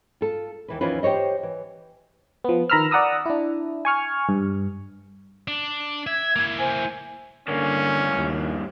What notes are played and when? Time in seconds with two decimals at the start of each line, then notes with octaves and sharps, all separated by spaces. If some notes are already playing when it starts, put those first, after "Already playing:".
0.21 F4 A4
0.68 D#2 E3 B4
0.81 D#2 E3 F3 C#4 F4 B4
1.03 G4 C5 C#5 D#5
1.43 E3
2.44 F3 B3
2.70 D#3 A#5 B5 E6 F6
2.91 D5 F#5 A#5 D#6 E6
3.26 D4 E4
3.85 G#5 C#6 F6
4.29 G2
5.48 D4
6.07 E5 G#6
6.36 A#3 E4
6.58 C5 G#5
7.48 G2 D3 A#3 C#4
8.17 D#2